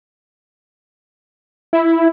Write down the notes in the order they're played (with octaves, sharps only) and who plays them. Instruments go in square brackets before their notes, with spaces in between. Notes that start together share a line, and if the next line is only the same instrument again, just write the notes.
[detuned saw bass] E4